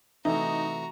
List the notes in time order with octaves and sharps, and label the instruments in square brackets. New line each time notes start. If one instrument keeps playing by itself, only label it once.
[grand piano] C3 E3 A3 [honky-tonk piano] D#4 [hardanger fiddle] F#4 A#5 [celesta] E5